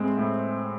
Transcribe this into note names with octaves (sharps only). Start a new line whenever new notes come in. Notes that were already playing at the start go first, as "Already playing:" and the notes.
Already playing: A2 G#3 C4
A2